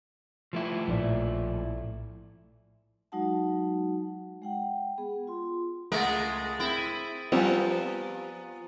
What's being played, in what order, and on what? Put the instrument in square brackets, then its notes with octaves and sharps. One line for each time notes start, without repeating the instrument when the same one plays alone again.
[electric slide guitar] F3 A3 E4
[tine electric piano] A#1 A2 D5
[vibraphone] F#3 G#3 D#4 F#4 F#5 A5
G#3 F#5 G5
B3 G#4
F4 C6
[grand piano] C#2 A3 F#5 [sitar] G#3 A#4 [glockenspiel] D#6 A6
[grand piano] C4 [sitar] E4
[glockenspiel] D#7
[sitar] F3 [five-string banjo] G3 C4 F4 [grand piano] B3 [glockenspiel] G#5 A#5 F7